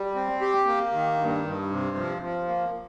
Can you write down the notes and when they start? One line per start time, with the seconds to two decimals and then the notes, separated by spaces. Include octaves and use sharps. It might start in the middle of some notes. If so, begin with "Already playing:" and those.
Already playing: G3
0.15 C4
0.41 G4
0.67 A#3
0.93 D#3
1.19 G2
1.45 G2
1.71 C3
1.97 F3
2.22 F3
2.48 A#3